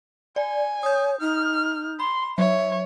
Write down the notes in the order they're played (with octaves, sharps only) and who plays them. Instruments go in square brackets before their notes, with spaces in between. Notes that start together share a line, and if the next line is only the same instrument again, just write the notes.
[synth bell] D5 [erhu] G#5
[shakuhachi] C#5 [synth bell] D#6 G6
[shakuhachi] D#4 [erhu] F6
[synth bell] B5 [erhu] C6
[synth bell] F#3 [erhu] C#5 [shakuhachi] E5